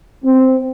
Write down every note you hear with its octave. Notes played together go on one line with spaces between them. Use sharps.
C4